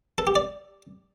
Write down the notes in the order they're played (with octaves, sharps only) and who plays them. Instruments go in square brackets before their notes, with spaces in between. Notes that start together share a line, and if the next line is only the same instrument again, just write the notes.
[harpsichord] A4
G4
D5